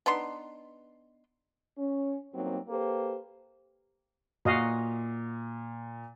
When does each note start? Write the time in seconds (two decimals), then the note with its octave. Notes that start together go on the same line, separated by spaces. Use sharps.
0.06 B3 D4 D#4 C6
1.77 C#4
2.33 G2 F#3 A#3 C4 D#4
2.69 A#3 G4 A4 B4 C5
4.45 A#2 F#4 D#5 F5